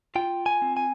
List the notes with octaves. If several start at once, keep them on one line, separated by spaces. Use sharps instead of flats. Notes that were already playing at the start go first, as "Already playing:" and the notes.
F4 G5
G#5
C4
G#5